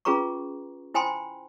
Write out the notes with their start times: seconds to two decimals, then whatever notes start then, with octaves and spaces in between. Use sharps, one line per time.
0.05 C#4 F4 G#4 B4 A#5 C#6
0.94 E4 C5 G5 G#5 B5 C6